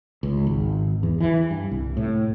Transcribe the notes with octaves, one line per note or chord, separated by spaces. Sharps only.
C#2
G#1
E2
E3
G2
C2
A2